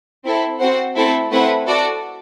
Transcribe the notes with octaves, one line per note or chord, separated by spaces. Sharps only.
C4 E4 A4
C4 F#4 C5 F#5
A3 C4 E4 A4
A3 C4 E4 B4 F#5
F#4 A4 D5